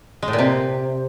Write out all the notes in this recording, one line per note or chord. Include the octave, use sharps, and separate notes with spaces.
G#3
A2
A#2
C3